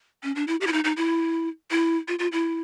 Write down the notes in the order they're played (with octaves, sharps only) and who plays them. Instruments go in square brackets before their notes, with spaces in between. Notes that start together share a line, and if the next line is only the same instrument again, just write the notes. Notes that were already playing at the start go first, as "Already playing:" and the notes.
[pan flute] C#4
D4
E4
G4
E4
D#4
D#4
E4
E4
F4
F4
E4